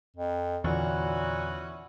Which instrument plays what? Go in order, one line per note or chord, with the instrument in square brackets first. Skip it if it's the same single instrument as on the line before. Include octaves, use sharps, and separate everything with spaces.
[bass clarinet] F2
[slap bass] E2 D3 [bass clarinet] A#2 [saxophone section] E3 C#4 F#4